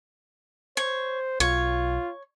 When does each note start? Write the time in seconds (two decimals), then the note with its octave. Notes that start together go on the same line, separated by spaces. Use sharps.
0.77 C5 C#5
1.40 B1 F4 C#5